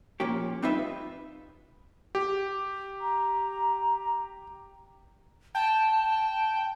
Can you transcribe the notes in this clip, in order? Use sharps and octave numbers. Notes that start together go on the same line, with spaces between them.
A#2 F3 A#3 C#4 G4
G3 C4 D#4 F4 B4 E5
G4
A#5
G5 A5